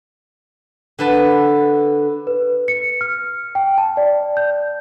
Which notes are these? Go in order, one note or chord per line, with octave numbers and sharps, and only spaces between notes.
D3 B4 A5
B4
C#7
F6
G5
A5
D5
G6